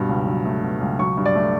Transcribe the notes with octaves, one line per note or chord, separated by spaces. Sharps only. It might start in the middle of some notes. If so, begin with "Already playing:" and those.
Already playing: G2 B2
C#2
F#3
A3
B2
C#2
F#3 C#6
G2
D5
A3